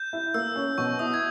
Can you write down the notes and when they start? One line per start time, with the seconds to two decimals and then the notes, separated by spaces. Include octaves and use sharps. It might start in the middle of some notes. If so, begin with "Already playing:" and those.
Already playing: G6
0.13 E4
0.34 A#3 E6
0.56 C#4
0.78 B2 C#6
0.99 E4 D#6
1.14 G#6